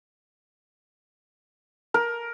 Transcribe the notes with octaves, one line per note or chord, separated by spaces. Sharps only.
A#4